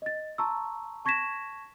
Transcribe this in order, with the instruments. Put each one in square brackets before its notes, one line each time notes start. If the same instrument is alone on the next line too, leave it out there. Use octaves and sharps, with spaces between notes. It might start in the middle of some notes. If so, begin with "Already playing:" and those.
[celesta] D#5 A6
A5 A#5 C6 C#6 E6
A5 C#6 G#6 A#6 B6 E7